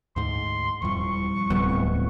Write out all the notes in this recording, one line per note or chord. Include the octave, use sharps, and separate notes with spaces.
D2 G#2 C6
D#1 F2 F3 G3 E4 C#6
D1 F#3 B3 C4